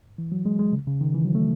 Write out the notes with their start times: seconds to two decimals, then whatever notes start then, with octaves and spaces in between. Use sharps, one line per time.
0.18 E3
0.32 F#3
0.46 G#3
0.59 G#3
0.73 C#3
0.87 C#3
1.01 D#3
1.14 E3
1.25 F#3
1.35 A3